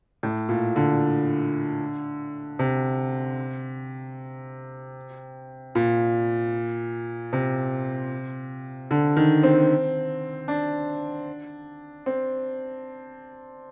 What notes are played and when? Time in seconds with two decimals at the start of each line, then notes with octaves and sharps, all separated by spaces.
0.23 A2
0.49 A#2
0.76 D3
2.59 C3
5.75 A#2
7.33 C3
8.91 D3
9.17 D#3
9.43 C4
10.48 D4
12.06 C4